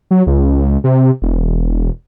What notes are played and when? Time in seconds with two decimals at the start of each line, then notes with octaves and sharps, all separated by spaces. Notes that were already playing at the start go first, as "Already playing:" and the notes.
0.11 F#3
0.27 C#2
0.84 C3
1.22 E1